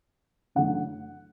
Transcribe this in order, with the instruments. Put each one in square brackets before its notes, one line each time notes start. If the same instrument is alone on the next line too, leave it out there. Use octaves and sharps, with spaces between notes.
[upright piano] F#2 C#3 E3 A3 D4 F#5